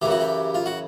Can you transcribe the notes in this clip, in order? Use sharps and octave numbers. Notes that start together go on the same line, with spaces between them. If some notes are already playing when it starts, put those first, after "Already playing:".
F#2 C#3 E3 G4
F#4
G4
F4
F#4